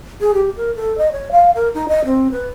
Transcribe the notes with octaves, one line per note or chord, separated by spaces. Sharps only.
G#4
G4
A#4
A4
D#5
C#5
F5
A#4
D#4
D#5
C4
B4